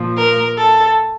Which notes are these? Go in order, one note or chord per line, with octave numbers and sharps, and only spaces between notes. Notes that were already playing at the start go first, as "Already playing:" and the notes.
Already playing: A#2 F3
A#4
A4